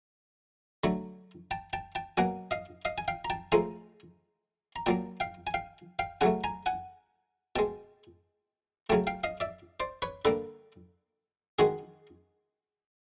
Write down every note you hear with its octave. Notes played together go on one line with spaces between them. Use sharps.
D3 F#3 A3
G5 A5
G5 A5
G5 A5
B2 F#3 A#3 F#5 G#5
D#5 F5
D#5 F5
G#5
F5 G5
A#5
G5 A5
A2 F3 G#3 G#5 A#5
A#5
A#2 F#3 A#3 G5 A5
F5 G5
G#5
F5 G5
F5 G5
C#3 F#3 A3 F#5 G#5
G#5 A#5
F#5 G#5
B2 G#3 G5 A5
C#3 F#3 A3 G5 A5
F5 G5
D#5 F5
D5 E5
C5 D5
B4 C#5
D3 G3 A#3 A4 B4
D#3 G#3 F#4 G#4